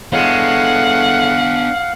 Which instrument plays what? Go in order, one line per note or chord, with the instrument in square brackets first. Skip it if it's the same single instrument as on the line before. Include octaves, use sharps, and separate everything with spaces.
[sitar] A2 G#3 [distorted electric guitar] B3 D4 [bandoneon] F5 [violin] F#5